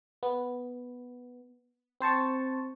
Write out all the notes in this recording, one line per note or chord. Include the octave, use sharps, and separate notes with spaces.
B3
C4 C5 A5 C#6